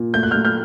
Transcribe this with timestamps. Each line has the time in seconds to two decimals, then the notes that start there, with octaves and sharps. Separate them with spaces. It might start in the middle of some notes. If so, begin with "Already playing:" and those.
Already playing: A#2
0.14 A3 G6
0.23 F#6
0.31 A3 F6 G6
0.45 F6 G6